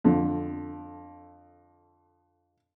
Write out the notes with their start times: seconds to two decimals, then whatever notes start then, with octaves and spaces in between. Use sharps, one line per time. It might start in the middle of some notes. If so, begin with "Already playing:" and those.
0.04 F2 D3